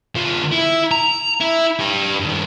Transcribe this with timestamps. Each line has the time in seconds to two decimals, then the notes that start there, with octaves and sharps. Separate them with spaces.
0.15 D3 F4
0.52 E4
0.91 A#5
1.41 E4
1.79 G4 B4
2.20 G2 D#3